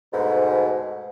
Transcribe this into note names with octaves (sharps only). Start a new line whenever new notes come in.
D2 G#2 B2